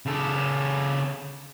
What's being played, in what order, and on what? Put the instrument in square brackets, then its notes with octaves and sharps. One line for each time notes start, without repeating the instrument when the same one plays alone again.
[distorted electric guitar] C#3 A4